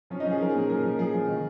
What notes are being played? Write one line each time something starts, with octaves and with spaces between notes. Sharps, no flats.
F3 C#4
D#4
F3 G#4
F3 A#4
G#4
A#2
G#4
F3 A#4
F3
F3 G#4
F3
D#3